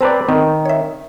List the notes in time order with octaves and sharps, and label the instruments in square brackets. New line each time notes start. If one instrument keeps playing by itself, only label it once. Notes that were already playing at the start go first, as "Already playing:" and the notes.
[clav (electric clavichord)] C4 B4 D5 [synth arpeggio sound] C5 A5 A#5
[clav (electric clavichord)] D#3 [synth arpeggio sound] C4
[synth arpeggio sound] C#5 E5